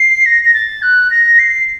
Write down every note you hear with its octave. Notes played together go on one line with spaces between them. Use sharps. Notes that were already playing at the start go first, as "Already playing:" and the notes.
Already playing: C7
A#6
A#6
A6
F#6
A#6
C7